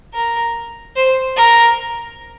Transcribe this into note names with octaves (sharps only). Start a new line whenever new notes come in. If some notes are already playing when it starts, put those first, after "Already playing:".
A#4
C5
A#4